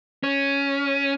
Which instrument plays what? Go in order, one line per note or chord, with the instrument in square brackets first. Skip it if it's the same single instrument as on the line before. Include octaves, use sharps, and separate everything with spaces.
[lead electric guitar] C#4